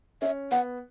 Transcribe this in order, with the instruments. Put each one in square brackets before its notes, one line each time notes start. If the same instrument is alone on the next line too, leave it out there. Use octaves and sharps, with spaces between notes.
[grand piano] C#4 [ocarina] E5
[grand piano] B3 [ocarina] F#5